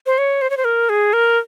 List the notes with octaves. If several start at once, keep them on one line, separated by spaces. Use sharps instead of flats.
C5
C#5
C5
C#5
C5
A#4
G#4
A#4